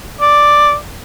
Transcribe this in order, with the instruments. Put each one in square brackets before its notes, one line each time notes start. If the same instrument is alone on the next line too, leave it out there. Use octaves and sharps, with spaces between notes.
[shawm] D5